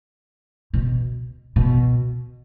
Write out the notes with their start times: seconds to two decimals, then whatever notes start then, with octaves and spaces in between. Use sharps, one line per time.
0.74 B2
1.56 B2